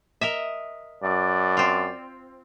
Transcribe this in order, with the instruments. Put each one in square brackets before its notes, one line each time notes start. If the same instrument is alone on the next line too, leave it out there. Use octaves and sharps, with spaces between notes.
[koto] A#4 D#5 E5
[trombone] F#2 [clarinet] D5
[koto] C4 F4